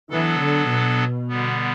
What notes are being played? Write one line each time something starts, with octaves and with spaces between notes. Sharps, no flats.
E3 F#3 B3 D4 A4
D3
B2
D3 G3 B3